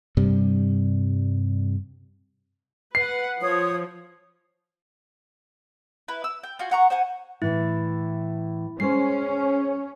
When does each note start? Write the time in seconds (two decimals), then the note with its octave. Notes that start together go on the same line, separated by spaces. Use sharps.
0.17 G2 C3 G3
2.95 B4 F#5 C7
3.41 F3 C#5 D#6
6.08 E4 B4
6.24 E6
6.43 G5
6.59 F4 F#4 G#5
6.71 F#5 A#5 C#6
6.90 C5 F#5 G#5
7.42 A2 E3 E4
8.80 G#3 C#4 C5 C7